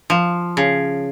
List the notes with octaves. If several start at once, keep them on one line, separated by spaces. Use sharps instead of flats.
F3
C#3